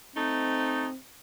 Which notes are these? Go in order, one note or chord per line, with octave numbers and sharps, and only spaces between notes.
A3 C4 D#4